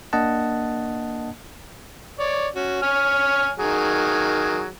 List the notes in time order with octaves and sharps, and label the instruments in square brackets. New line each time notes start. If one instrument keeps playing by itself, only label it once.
[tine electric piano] A#3 D4 D#5 F#5 A5
[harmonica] C#5 D5
C#4 F#4
C#5 G#5 F6
D#3 F#3 G#4